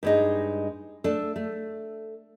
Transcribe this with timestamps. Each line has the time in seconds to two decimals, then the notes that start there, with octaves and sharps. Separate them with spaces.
0.03 G2 G#3 D#4
1.04 A3 D4 A4
1.36 A3